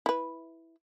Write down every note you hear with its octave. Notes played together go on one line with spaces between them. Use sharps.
E4 B4